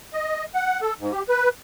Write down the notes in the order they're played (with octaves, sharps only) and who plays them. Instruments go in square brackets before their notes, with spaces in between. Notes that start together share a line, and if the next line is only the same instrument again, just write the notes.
[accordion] D#5
F#5
A4
G#2
G4
B4